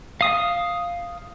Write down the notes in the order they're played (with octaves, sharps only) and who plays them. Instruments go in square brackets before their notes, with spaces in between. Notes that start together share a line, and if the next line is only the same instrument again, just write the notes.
[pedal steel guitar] F5 D#6